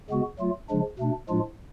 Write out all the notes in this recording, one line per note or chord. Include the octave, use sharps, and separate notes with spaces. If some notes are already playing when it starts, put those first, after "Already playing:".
C#3 G#3 B3 F#4
F#3 A3 F4
C#3 F3 G#3 D4
B2 A3 D4
A2 F3 G#3 D4 F4